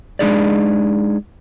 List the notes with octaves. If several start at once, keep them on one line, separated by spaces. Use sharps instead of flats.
G#3 D4 D#4 G#4 D5